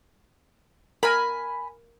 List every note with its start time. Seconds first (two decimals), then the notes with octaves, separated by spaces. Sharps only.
1.03 A#4 G#5 B5